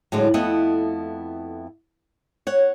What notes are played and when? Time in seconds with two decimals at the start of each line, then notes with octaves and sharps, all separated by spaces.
0.12 A2 D3 F#3 G#3
0.34 F2 A3 B3 E4 D#5 F#5
2.47 C#5 F#5